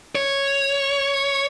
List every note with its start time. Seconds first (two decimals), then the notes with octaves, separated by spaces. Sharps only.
0.15 C#5